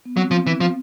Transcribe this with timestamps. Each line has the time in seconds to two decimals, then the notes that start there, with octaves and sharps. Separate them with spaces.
0.05 B3
0.17 F#3 C4
0.31 F3
0.47 E3
0.60 F3